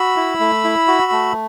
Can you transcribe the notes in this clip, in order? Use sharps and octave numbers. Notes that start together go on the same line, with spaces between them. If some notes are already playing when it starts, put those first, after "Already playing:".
Already playing: F#4 B5 E6
E4
A3
E4
F#4
A3